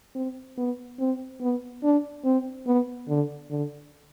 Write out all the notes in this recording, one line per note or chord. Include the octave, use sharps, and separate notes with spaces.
C4
B3
C4
B3
D4
C4
B3
D3
D3